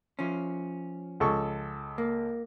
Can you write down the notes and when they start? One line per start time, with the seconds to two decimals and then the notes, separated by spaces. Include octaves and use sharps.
0.19 F3 C#4
1.20 C#2 A4 C#6
1.98 A#3